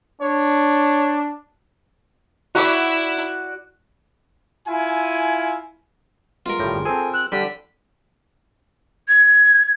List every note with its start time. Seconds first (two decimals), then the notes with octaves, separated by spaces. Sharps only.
0.21 D4 C#5
2.55 E4 F#4 D5
4.67 E4 F4 G#5
6.46 G#3 B3 F4 A#4
6.59 G1 A2 G3 G6 A#6
6.72 G1 G#4
6.85 C4 G#4 A4 C5 G#5
7.14 E6 F#6
7.32 D3 G3 D4 B6
9.08 G#6